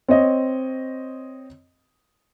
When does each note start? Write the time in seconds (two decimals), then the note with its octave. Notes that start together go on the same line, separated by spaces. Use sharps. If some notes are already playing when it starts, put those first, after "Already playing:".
0.08 C4 C#5 D#5